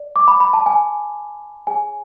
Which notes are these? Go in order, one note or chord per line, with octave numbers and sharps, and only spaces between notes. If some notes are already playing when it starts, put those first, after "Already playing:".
Already playing: D5
D6
B5
B5
A5
G#5
G#4 C#5 G#5